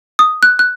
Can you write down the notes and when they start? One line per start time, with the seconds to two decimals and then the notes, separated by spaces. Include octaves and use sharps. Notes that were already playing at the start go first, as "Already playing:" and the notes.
0.19 D#6
0.43 F#6
0.59 F#6